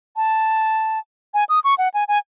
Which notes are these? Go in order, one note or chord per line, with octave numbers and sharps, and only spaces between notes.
A5
G#5
D#6
C#6
F#5
G#5
G#5